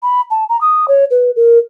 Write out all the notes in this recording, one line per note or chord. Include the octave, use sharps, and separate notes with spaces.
B5
A5
A#5
D#6
C#5
B4
A#4